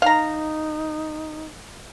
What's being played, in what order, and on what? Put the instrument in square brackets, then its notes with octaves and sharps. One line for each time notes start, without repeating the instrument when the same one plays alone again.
[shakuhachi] D#4 [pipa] F5 A#5